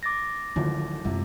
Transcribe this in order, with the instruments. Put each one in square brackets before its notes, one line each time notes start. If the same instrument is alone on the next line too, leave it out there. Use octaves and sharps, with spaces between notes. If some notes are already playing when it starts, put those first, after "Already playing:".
[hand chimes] D6 A6 A#6
[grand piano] D1 G#1 F3 [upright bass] D3
[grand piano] D#1 C2 C3 [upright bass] F#2 G#3